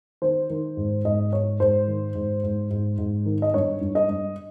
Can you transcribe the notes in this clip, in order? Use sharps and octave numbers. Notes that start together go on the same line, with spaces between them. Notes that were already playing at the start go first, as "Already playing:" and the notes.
D#3 C5
D#3
G#2
G#2 D#5
G#2 C#5
G#2 C5
D#3
G#2
G#2
G#2
G#2
D#3
D#5
G2 C#5
G2
D#5
G2